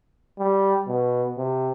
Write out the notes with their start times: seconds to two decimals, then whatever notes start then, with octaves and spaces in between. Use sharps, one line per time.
0.39 G3
0.88 B2
1.38 C3